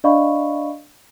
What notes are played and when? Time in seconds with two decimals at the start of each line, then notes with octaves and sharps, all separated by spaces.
0.04 D4 D5 D#5 F5 B5 C#6